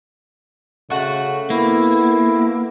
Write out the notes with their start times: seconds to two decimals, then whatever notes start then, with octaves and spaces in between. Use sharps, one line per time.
0.90 C#3 A3 F#4
1.50 A#3 B3 E4